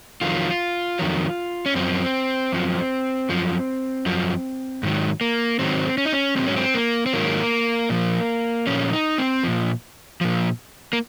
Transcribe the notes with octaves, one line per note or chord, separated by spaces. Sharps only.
F2 D#3 F#3 F4
F2 D#3 F#3
C#4
F#2 F3 C4
F#2 F3
F#2 F3
F#2 F3
G#2 D#3 F#3
A#3
G#2 D#3 F#3 C4
C#4
D#4
C#4
G#2 D#3 F#3 C4
C#4
C4
A#3
C4
G#2 D#3 F#3 A#3
A#2 F3
A#2 F3 C#4
D#4
C4
A#2 F3
A#2 F3
A#3